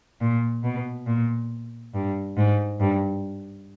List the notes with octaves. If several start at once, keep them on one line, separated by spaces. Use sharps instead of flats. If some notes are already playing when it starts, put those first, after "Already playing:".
A#2
B2
A#2
G2
G#2
G2